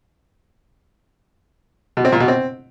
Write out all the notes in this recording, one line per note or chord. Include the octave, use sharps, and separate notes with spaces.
B2
C4
A#2
B2
C4